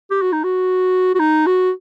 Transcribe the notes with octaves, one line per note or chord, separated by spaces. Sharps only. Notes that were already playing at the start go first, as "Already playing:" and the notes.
G4
F#4
D#4
F#4
F#4
D#4
F#4